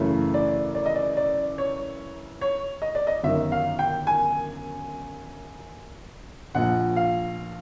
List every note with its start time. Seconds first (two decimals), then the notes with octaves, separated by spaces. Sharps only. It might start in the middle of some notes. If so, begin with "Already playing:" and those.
Already playing: F#2 C#3 E3 A3
0.34 D5
0.75 D5
0.86 D#5
0.95 D5
1.17 D5
1.58 C#5
2.41 C#5
2.82 D#5
2.95 D5
3.07 D#5
3.24 G1 F#2 D#3 E5
3.52 F5
3.79 G5
4.07 G#5
6.55 A#1 A#2 F3 F#5
6.96 F5